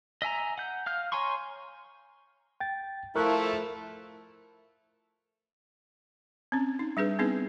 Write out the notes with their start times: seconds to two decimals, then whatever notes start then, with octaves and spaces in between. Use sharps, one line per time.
0.22 D#5 E5 G#5 A#5
0.58 F#5 G6
0.86 F5 F6 G6
1.12 C#5 G#5 A#5 C6 C#6
2.60 G5 A6
3.16 F3 A3 E4 A#4 C#6 F#6
6.52 C4 C#4
6.79 D#4
6.97 G3 D4 G#4 B4
7.19 B3 C4 D4 D#4 G#4 B4